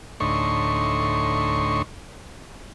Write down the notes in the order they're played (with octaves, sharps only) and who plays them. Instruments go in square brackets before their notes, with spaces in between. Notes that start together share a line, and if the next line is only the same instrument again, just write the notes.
[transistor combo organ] D2 A2 D#4 C#5 C6 C#6